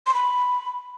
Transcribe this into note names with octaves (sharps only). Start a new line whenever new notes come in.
C6
B5